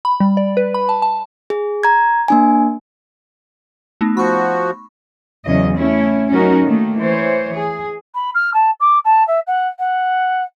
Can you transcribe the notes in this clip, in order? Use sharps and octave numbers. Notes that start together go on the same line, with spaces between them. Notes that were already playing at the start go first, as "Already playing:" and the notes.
B5
G3
D5
B4
B5
A5
A5
G#4
A#5 G#6
A#3 D4 G#5
A3 B3 D#4
F3 F#4 B5 C#6
E2 C#3 E3 F#3 D#5
A3 C#4 E4
F#3 C#4 D#4 F#4 A#4
D#3 A3 A#3
E3 C5 C#5
G#4
B5
F6
A5
D6
A5
E5
F#5
F#5